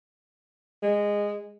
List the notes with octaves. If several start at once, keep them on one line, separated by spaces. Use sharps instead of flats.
G#3